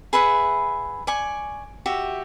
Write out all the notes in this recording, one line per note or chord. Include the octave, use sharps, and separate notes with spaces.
G#4 B4 E5 F#5
D5 G#5 C#6
F#4 G4 E5